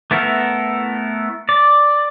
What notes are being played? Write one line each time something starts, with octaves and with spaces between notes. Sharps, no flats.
A3 B3 E4 A4 A#4
D5